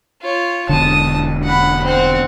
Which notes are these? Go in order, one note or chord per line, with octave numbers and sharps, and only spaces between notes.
F4 C#5
E1 D3 A5 D#6
F#5 B5
C4 F#5